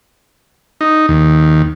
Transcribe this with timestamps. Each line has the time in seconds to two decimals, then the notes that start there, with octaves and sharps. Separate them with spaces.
0.81 D#4
1.09 D#2